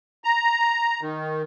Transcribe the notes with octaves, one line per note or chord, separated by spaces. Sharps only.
A#5
D#3